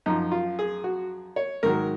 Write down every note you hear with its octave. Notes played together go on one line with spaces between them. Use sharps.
F#2 F3 D#4
F4
G#4
F#4
C#5
G#2 D#3 F#3 A#4